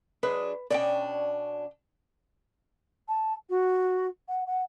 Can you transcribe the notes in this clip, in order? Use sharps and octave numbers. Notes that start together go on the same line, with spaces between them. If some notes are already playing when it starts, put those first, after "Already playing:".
F#3 G#3 D4 B4
B2 C#4 D4 D5 D#5 G5
A5
F#4
F#5
F#5